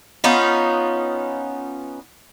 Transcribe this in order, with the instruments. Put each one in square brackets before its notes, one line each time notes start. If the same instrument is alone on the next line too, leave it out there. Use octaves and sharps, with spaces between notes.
[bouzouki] B3 C#4 D#4 F4